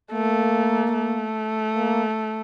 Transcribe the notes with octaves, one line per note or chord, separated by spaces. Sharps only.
A3 A#3
A3
A#3